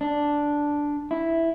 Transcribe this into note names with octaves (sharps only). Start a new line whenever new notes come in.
D4
E4